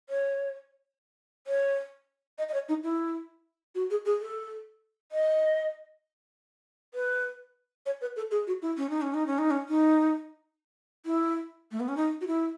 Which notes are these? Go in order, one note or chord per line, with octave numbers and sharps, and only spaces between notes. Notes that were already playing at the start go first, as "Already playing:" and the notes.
C#5
C#5
D#5
D#5
C#5
D#4
E4
F#4
G#4
G#4
A4
D#5
B4
C#5
B4
A4
G#4
F#4
E4
C#4
D#4
C#4
D#4
C#4
D#4
C#4
D#4
E4
A3
B3
C#4
D#4
F#4
E4